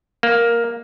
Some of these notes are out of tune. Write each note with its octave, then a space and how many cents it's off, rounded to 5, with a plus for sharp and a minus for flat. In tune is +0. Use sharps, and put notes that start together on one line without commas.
A#3 +5